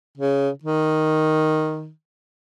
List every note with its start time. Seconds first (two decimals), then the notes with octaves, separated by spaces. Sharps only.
0.18 C#3
0.64 D#3